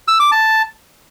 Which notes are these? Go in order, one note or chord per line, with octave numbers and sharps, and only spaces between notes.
E6
D6
A5